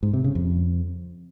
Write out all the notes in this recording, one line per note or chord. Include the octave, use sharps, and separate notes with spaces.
G#2
C3
C#3
F2